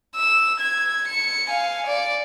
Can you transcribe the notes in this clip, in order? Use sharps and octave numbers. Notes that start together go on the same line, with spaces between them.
E6
G#6
C#7
F5 G#5
D5